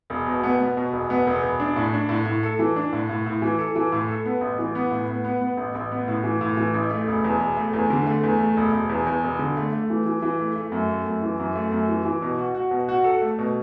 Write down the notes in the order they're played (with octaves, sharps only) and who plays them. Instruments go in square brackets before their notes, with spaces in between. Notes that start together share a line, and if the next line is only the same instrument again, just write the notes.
[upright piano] E1
B2
B3
B3
B2
E1
B3
E1
E1
D4
A2
D4
A2
A2
A4
E3
D4
A2
A2
A2
E3
A4
E3
A2
A4
B3
A1
E3
B3
A2
B3
B3
B3
A1
A1
B3
A2
E3
A2
E3
A1
A3
E1
E2
E1
A3
E2
D3
A3
E2
A3
E1
E1
E2
E2
E1
D3
A3
A3
E3
E3
E3
A3
A3
F#2
A3
F#2
E3
F#2
A3
F#2
E3
E3
B2
F#4
F#4
B2
F#4
A4
A3
B2